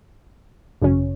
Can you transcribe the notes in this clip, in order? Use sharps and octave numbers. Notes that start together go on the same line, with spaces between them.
G#1 F#2 C#3 F#3 C#4